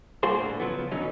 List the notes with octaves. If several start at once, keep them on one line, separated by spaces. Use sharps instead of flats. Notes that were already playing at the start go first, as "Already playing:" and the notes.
G3 A#3 F4 F#4 G#4 C5
A2 D3
C#3 F3 F#3 B3
E2 B2 D3 F#3 C#4 D#4